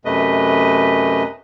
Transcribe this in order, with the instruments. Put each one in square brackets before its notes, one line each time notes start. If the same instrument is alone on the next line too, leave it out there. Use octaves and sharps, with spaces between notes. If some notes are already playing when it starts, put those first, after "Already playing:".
[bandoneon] F#2 C3 A3 B4 D#5